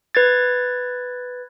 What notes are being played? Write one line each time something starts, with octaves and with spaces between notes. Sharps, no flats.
B4 G#6 A6